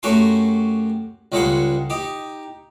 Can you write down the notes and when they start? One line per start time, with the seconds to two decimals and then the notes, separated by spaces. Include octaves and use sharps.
0.03 F#2 A3 F#4 G4 G#5 C6
1.32 C#2 G3 G#3 A4 F#5 C6
1.90 D#4 G4